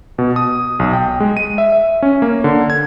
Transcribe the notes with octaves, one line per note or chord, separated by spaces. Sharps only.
B2
D#6
B1
G5
G#3
D#7
E5
E5
C#4
A#3
D3
G#6